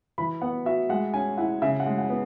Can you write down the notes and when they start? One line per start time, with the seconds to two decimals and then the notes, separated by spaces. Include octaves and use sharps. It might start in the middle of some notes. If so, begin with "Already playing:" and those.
0.18 E3 B5
0.42 B3 F#5
0.66 F#4 E5
0.89 G#3 F#5
1.14 C#4 G#5
1.38 E4 F#5
1.62 C#3 E5
1.80 F#5
1.86 G#3
1.98 F#5
2.10 B3